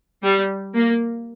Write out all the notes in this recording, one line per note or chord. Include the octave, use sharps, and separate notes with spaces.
G3
A#3